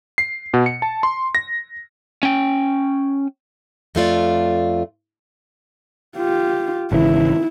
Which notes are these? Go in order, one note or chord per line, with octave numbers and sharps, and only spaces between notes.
C7
B2
C#7
A5
C6
A#6
C#4 G5
F2 A3 F4 D5
F4 G4
G#1 C#3 E3 E4